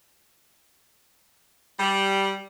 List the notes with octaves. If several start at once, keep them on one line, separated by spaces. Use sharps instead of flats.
G3